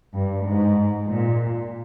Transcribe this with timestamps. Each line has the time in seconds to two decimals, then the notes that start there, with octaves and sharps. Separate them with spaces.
0.13 G2
0.45 G#2
1.06 A#2